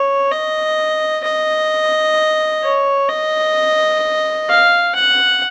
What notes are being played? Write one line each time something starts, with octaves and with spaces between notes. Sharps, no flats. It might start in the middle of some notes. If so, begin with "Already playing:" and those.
Already playing: C#5
D#5
D#5
C#5
D#5
F5
F#5